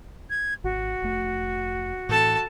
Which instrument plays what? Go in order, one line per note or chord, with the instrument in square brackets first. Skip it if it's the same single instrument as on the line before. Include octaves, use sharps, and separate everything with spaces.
[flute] G#6
[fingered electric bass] G#1 [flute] F#4
[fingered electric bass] F1 A3
[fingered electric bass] A2 E3 C4 [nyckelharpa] A4 A5